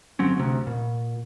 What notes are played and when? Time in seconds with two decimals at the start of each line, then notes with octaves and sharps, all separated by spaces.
0.19 G1 F#3 C4 C#4
0.37 D2 C3
0.67 A#2